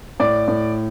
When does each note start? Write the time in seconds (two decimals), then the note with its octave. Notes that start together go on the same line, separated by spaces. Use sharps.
0.20 A2 D5
0.48 A2